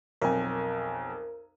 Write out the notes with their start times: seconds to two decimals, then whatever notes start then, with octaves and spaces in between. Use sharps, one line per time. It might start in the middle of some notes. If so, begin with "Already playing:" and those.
0.22 B1 F2 A#4 G#5